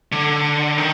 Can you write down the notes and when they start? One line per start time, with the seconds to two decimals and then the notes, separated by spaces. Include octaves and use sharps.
0.12 D3
0.78 D#3